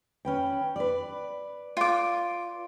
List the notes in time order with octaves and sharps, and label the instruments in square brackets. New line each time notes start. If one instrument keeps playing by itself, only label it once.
[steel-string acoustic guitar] C#4 B4 G5
B4 D5
[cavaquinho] F4 D6